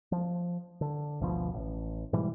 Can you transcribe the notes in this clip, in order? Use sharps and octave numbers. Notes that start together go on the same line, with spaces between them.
F3
D3
G#1 D2 B2 F3
A1
G#2 B2 E3 G3